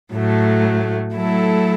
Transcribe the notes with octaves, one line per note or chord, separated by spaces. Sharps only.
A2 F#3 A3
F#3 A3 E4 A4